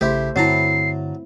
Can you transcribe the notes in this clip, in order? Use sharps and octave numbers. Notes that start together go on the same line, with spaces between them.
A#1 C#3 A3 E4 G4 C5
G2 D3 F#3 C4 E4 A5 A#5 C7